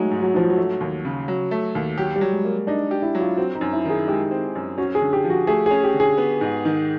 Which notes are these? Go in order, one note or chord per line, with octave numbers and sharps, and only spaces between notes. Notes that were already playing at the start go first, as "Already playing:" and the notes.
Already playing: F#3 G#3 A3 D#4
G#2
F#3
G#2 F3
F#3
A3
D#2
C#3
F#3
A3
D#2
F#3 G4
G3
F#3
G#3
A#3
D4 D#4
G4
E4
F#3
F4
C4 F#4
D#4
F#2
E4
D#3 G#4
G#3 G4
C4
F#2
C#4 F#4
G#4
D3
G4
F3
F#4
A3 G#4
G#4
C#4
G4
D3
G#4
B3
G#2
D#3